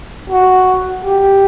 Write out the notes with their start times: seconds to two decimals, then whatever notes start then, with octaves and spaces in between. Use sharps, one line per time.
0.30 F#4
1.05 G4